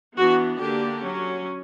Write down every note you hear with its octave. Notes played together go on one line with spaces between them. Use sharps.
E3 B3 D4 F#4
D3 A#3 D4 G4
F#3 C#4